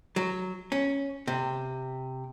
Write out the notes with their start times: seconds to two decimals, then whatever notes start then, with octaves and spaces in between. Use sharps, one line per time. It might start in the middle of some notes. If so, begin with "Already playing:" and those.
0.16 F#3
0.72 C#4
1.27 C3